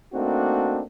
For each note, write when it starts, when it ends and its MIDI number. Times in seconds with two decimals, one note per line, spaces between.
0.14 0.82 57
0.14 0.82 58
0.14 0.82 60
0.14 0.82 62
0.14 0.82 63
0.14 0.82 66